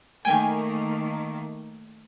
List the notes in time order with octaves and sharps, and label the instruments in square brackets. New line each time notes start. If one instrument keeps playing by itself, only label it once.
[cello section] D#3 A3 A#3 [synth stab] G5 G#5